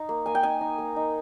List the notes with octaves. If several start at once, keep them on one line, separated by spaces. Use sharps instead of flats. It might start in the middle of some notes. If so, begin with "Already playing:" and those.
Already playing: D#4
A#3
A#3 G#5
G5
D#4 G#5
D#4
A#3
D#4